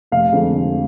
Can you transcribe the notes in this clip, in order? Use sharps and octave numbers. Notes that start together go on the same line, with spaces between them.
F1 F5
F2 D3 G#3
F1